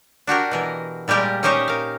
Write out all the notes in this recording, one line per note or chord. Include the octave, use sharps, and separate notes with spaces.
D4 F#4 G4 A#4
B2 E3 A#4
A#2 G3 G#3 G4 A#4
C#4 D#4 G4 C5 C#5 D#5
A#4 F5